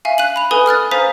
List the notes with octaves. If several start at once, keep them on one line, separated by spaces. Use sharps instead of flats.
E5 F5 G#5
F#6 D#7 F#7
B5 F7
A4 B4 G#5 B5 D#6
D#6 F6 F#6 A6
C5 F5 G#5 A#5 D#6 B6